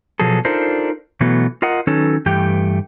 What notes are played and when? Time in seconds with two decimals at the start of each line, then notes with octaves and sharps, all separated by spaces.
0.20 B2 F3 F#3 G#4 A4
0.45 D4 D#4 F4 A4 A#4 C5
1.21 B2 E3 F#3 A3 B3
1.62 F4 A#4 D#5 F#5
1.87 D#3 F#3 C#4 D#4 A4 B4
2.26 G2 E3 A3 G4 G5